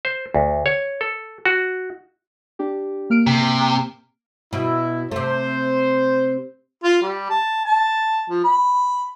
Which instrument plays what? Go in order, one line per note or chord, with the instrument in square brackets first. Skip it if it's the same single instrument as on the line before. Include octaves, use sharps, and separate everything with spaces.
[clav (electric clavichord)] C5
D2
C#5
A4
F#4
[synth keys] D4 G4
A#3 F6 D7
[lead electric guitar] C3
[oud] B2 [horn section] E4
[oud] C3 A3 [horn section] C5
[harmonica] F4
G3
A5
A5
F3
B5